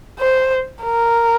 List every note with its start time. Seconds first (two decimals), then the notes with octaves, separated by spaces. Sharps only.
0.19 C5
0.84 A#4